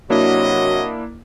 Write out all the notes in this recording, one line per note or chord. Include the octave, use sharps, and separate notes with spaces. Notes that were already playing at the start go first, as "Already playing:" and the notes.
C3 F#3 A#3 D4 E4 F#4 D#5